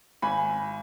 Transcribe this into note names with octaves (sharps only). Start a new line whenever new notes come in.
G#1 G#5 B5